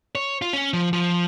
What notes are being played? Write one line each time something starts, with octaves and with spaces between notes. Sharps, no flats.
C#5
F4
C#4
F3
F3